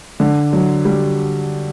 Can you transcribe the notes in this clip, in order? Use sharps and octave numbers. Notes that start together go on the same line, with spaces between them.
D3
F#3
G3